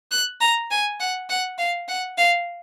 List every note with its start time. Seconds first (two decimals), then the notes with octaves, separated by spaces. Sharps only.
0.11 F#6
0.41 A#5
0.71 G#5
1.00 F#5
1.29 F#5
1.58 F5
1.88 F#5
2.18 F5